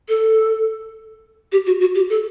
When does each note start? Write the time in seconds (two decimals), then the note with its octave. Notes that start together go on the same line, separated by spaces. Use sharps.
0.09 A4
1.52 G4
1.66 F#4
1.80 F#4
1.95 G4
2.09 A4